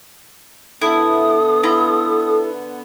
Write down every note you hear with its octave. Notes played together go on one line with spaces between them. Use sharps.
D3 B3 E4 A4 D#6
E4 F4 A#5